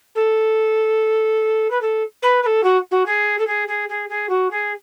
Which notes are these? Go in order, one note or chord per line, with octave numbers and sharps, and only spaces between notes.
A4
B4
A4
B4
B4
A4
F#4
F#4
G#4
A4
G#4
G#4
G#4
G#4
F#4
G#4